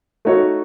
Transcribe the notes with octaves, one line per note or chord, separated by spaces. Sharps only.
A3 D#4 F#4 C#5